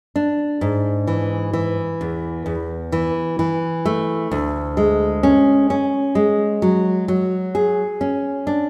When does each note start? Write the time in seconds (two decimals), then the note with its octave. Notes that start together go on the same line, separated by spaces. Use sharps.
0.16 D4
0.61 G#2
1.07 E3
1.53 E3
2.01 E2
2.46 E2
2.92 E3
3.39 E3
3.86 A3
4.31 D2
4.77 G#3
5.23 C#4
5.70 C#4
6.15 G#3
6.62 F#3
7.08 F#3
7.55 G#4
8.01 C#4
8.47 D4